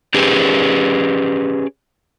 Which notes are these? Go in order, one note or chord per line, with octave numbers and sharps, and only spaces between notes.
C#4 G4 G#4 B4